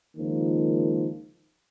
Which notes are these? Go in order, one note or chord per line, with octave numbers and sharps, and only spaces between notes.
C#2 D#3 F3 A#3